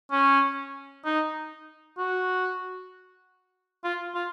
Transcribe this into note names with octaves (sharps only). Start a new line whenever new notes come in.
C#4
D#4
F#4
F4
F4